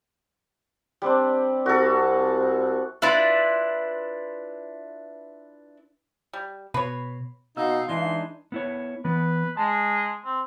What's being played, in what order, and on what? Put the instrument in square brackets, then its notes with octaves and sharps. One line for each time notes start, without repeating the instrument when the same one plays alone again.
[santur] G3 C4 D4
[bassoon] C2 [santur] F#4 A4
[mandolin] D4 E4 F4 [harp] B4 E5
[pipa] G3
[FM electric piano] B2 [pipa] B4 C#5
[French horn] B2 [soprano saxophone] D#4 [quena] F5 [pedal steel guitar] E6
[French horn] E3 [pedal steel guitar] G#3 D4 D#4 [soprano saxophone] C6
[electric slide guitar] B3 E4 C#5
[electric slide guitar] E3 B3 [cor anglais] B4
[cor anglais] G#3 [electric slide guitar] A5
[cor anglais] C4